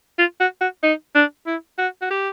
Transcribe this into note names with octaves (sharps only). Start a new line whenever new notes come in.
F4
F#4
F#4
D#4
D4
E4
F#4
F#4
G4